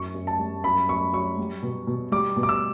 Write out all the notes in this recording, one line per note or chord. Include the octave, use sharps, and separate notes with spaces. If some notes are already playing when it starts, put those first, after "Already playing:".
Already playing: F#2 C#6
F#2
A5
G3
F#2 B5
F#2 C#6
F#3 C#6
G3
B2
B2
G3 D6
B2
D6
E6